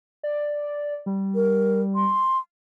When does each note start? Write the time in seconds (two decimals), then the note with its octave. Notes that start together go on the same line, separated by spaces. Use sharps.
0.23 D5
1.06 G3
1.35 A#4
1.95 C6